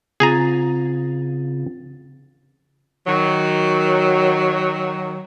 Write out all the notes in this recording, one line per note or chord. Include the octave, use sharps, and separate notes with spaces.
C#3 C4 F4 G#4 G#5 A#5 A6
D#3 F#3